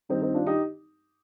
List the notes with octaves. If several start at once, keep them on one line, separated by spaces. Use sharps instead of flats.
G2 D#3 G3 C4 D#4
C4 D#4
D4 F4
D#4 G4